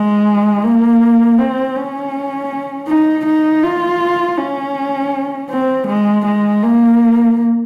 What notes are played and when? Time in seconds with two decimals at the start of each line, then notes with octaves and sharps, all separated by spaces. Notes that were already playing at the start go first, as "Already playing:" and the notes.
Already playing: G#3
0.63 A#3
1.38 C4
1.76 C#4
2.88 D#4
3.25 D#4
3.63 F4
4.38 C#4
5.50 C4
5.87 G#3
6.25 G#3
6.62 A#3